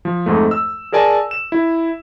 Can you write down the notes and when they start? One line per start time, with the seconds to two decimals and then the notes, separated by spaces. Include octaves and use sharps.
0.05 F3
0.26 F2 G#2 A3
0.51 E6
0.92 G#4 A#4 D5 G#5 A5
1.31 E7
1.52 E4